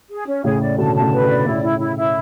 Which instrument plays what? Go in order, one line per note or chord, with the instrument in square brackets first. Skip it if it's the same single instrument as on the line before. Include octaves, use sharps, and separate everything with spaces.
[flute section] G#4
C#4
[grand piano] A2 C#3 [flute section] G#4
[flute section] D5
[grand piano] B2 D3 [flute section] A5
[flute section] A5
[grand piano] A2 C#3
[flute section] B4
[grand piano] B2 D3
[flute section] D5
[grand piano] A2 C#3 [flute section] E4
[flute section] E4
E4
E4